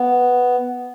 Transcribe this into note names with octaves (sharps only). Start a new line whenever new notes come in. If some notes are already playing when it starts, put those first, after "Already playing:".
Already playing: B3